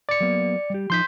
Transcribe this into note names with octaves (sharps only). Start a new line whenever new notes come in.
D5 C#7
F#3 A#3 B3
G3 G4
F3 D#4 C6 G6 B6